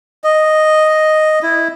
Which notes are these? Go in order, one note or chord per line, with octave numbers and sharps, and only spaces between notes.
D#5
E4